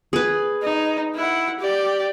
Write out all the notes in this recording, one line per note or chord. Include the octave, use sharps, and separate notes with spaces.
G#4 B4
D#4
E4 F#5
G4 D5